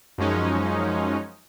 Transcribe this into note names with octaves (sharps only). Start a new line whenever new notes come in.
F#2 F3 G#3 C#4 D#4